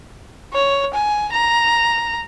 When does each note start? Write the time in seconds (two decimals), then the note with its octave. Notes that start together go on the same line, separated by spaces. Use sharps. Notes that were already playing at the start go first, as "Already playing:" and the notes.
0.53 C#5
0.94 G#5
1.32 A#5